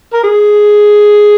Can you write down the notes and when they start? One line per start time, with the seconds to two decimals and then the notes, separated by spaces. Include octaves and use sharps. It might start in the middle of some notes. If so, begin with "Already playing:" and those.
0.14 A#4
0.23 G#4